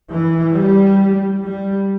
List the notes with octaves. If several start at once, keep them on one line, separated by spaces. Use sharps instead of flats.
E3
G3
G3